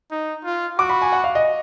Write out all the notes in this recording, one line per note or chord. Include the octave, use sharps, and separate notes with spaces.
D#4
F4
F#4 D6
B5
G#5
F#5
F5
D#5